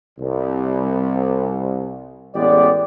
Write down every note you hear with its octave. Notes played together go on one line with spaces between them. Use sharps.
C2
A1 E2 G#3 B3 G4 D5